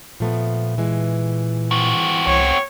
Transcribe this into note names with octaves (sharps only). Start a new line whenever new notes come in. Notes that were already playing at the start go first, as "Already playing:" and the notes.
A#2 F3 A3 B3
E3 G#3
C4 F#4
C2 C#5